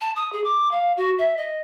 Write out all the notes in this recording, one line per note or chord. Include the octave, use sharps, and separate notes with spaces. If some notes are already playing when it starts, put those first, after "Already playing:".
A5
D#6
G#4
D6
F5
F#4
E5
D#5